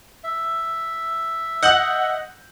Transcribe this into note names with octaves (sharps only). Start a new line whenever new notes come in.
E5
D#5 F#5 G6 F#7